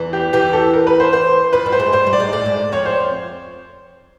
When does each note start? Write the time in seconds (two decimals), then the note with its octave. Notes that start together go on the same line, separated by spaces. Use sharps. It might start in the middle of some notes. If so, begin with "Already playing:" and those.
Already playing: E2 E3
0.13 G4
0.33 E2 E3 G4
0.53 A4
0.73 A#4
0.87 B4
1.00 C5
1.13 C5
1.53 F2 F3 B4
1.66 G2 G3
1.72 C5
1.80 G#2 G#3
1.92 G2 G3 C5
2.06 G2 G3
2.13 D5
2.20 G#2 G#3
2.32 A2 A3 D5
2.45 G#2 G#3
2.72 F2 F3 C#5
2.85 C5